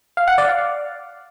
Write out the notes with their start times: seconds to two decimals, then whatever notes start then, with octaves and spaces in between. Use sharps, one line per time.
0.17 F5
0.28 F#5
0.38 D5
0.48 F5